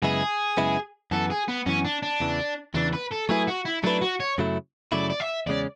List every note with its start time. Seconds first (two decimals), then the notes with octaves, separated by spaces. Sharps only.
0.03 F#2 C#3 G#3 B3 E4 G#4
0.57 F#2 C#3 G#3 B3 E4
1.11 F#2 E3 B3 A4
1.30 G#4
1.48 B3
1.66 F#2 E3 B3 C#4
1.85 D4
2.03 D4
2.20 E2 C#3 E3
2.74 E2 C#3 E3 D4
2.93 B4
3.11 A4
3.29 F#3 A3 E4 G#4 B4
3.48 F#4
3.65 E4
3.84 F#3 A3 D4 E4 B4
4.02 F#4
4.20 C#5
4.38 F#2 C#3 F#3 A3 E4
4.92 F#2 C#3 F#3 A3 E4 D5
5.10 D5
5.20 E5
5.46 E2 C#3 G#3 C#4 D5